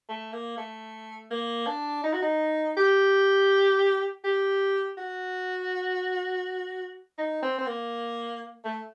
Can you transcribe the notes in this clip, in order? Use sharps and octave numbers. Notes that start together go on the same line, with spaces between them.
A3
A#3
A3
A#3
D4
D#4
F#4
D#4
G4
G4
F#4
D#4
C4
C4
A#3
A3